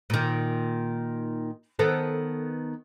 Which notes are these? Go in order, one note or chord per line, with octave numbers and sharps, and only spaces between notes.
A#2 D#3
D#3 B3 A4